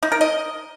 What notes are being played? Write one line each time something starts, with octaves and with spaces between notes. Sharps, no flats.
D#4
A#4
D#5